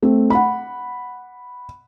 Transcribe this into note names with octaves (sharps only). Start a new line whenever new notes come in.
A3 C4
F#5 B5